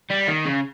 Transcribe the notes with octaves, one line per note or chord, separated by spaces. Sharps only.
G3
D#3
C#3